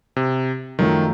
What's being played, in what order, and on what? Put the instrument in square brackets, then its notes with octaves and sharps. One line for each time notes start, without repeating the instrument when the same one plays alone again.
[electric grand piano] C3
[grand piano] F#2 F3 A3 [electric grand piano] D#3